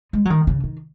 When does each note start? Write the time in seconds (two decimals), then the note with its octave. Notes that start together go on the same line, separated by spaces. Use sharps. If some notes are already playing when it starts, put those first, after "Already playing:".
0.13 G#3
0.25 F#3
0.30 D#3
0.47 C#3
0.64 D#3